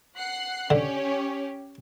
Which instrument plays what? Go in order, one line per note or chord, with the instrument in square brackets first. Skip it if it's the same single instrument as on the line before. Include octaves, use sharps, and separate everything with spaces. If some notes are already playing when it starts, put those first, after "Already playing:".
[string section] F#5 F#6 C7
[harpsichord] D3 [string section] C#4 G4 C#5